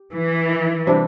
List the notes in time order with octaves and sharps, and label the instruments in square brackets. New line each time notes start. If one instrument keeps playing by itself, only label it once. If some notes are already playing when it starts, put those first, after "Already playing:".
Already playing: [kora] G4
[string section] E3
[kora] C3 G3 D4 G4